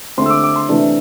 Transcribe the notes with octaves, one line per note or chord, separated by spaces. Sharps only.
D3 A3 C4 C6
E6
D6
D6
C6
C3 E3 A3 D4